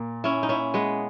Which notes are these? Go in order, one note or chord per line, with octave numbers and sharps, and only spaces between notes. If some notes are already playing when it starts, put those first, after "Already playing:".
Already playing: A#2 A#3
C#4 E4
D#4
C#4 E4
G#3 B3